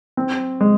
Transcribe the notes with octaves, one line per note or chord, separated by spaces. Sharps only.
C4
G#3